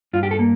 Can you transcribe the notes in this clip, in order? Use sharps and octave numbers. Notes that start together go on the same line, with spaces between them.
G2 F4
G4
A4
A#3